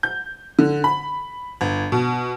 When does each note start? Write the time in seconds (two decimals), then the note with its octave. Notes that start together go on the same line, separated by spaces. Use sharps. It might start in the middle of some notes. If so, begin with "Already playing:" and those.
0.03 G6
0.59 D3
0.84 B5
1.61 G1
1.92 B2